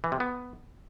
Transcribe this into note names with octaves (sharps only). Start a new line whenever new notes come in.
E3
C3
B3